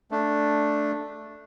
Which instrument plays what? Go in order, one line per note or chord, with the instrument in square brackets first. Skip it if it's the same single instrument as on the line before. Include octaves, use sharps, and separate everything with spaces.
[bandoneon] A3 D4